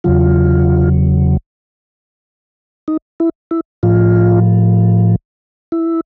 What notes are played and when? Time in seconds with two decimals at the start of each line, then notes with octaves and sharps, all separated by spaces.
0.04 E2 C#3 F#3 F4
2.88 D#4
3.20 E4
3.51 E4
3.83 A2 F3 F4
5.72 E4